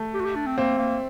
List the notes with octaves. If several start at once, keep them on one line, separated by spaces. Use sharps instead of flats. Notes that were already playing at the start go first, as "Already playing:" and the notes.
Already playing: A3
G4
F#4
G4
D4
C4
A#3 C4
A#3